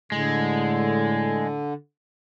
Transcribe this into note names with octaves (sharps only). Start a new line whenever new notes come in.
A2 D3 G#3